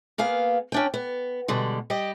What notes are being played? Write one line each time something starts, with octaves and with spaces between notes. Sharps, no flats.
A#3 B3 G#4 F5
C#4 D4 G5
B3
B2 D3 G3 G#3
G3 G4 D#5